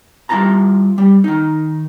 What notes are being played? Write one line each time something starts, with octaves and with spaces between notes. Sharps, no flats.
G3 E4 F4 A5 A#5
G3
D#3 D#4